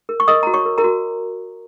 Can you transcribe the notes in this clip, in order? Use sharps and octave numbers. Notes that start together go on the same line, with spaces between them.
A#4
C#6
A#4 D#5 D#6
F#4 A#5
C#5 C#6
A#4
A#4 A#5
F#4